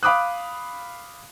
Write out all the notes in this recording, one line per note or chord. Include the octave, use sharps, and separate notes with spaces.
F5 B5 D6 D#6 F#6